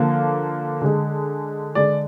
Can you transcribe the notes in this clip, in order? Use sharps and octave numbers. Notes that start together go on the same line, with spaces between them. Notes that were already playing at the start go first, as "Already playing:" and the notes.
Already playing: D3 F3 A#3
D3 G#3
D3 G#3 D5